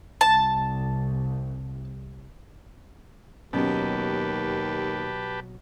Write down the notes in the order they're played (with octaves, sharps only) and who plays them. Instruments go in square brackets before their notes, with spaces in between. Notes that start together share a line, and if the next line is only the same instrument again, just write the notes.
[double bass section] C2 [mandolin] A5
[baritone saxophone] D#2 [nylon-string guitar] B2 F#3 [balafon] C#4 [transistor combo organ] G4 B4 A5